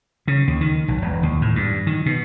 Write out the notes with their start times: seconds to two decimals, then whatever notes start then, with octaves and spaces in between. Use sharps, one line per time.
0.28 C#3
0.48 D#2
0.61 D#3
0.88 B1
1.02 E1
1.23 D#2
1.42 A2
1.56 G2
1.87 D#3
2.06 B2